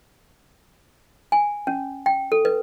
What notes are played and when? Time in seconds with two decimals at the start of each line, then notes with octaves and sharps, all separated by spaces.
1.32 G#5
1.67 C#4
2.06 G5
2.32 A4
2.45 B4